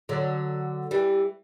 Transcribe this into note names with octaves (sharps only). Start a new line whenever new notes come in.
D3 F#3
E3 G3